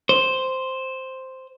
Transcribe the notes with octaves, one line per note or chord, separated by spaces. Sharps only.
C5